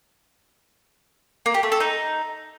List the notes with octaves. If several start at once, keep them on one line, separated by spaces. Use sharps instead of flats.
A#3
G4
A3
A4
D#4